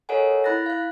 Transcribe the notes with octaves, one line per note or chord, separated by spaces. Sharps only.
A4 A#4 C#5 D#5 F#5 G#5
E4 B5 F#6 A6 A#6
F5 F#6